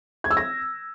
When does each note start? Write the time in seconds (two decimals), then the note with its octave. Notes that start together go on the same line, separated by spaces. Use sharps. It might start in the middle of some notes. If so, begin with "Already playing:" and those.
0.24 G#6
0.31 E6
0.37 A#6